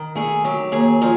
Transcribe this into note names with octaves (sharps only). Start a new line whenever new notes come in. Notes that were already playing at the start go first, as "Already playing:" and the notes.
Already playing: D#3
A3 G#4
F#3 G4
D#2 G#4
F3 G#4